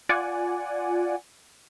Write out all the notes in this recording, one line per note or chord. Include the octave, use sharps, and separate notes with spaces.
F4 D5 F#5 G#5